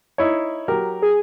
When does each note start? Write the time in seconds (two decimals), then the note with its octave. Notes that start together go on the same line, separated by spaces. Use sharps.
0.18 D#4 E4 C#5
0.68 F#3 G4 A#4
1.02 G#4